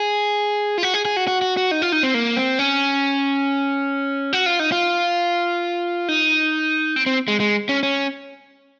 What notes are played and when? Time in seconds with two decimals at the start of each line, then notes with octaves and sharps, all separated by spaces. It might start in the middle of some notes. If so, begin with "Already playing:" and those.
Already playing: G#4
0.78 F4
0.83 F#4
0.94 G#4
1.05 G#4
1.17 F#4
1.27 F#4
1.42 F#4
1.57 F#4
1.71 D#4
1.82 F4
1.92 D#4
2.03 C4
2.14 A#3
2.37 C4
2.59 C#4
4.33 F#4
4.46 F4
4.59 D#4
4.72 F4
6.08 D#4
6.96 C4
7.06 C4
7.28 G#3
7.40 G#3
7.69 C#4
7.83 C#4